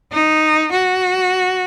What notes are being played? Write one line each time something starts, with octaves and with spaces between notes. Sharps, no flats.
D#4
F#4